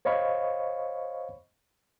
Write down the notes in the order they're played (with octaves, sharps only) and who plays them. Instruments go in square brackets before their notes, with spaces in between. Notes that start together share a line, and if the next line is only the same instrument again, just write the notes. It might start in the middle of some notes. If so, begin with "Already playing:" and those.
[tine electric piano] C5 C#5 D#5 F5 B5 C#6